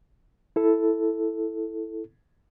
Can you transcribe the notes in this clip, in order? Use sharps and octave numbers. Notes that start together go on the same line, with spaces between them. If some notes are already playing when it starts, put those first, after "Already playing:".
E4 A4